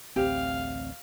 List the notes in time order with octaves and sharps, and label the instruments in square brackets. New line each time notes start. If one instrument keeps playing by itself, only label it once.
[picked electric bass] A1 D2 [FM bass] C4 [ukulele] G4 [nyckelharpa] F5